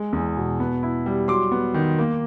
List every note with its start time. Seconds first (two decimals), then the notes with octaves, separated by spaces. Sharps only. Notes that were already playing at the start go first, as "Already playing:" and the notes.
Already playing: G#3
0.13 E2
0.37 B2
0.60 B3
0.83 E4
1.06 G3
1.28 F#3 C6 D6
1.51 B3
1.74 D#3
1.98 A#3